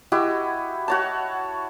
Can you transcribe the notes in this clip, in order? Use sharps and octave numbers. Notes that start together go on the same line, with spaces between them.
E4 F#4 G4 D#5
F#4 C#5 A5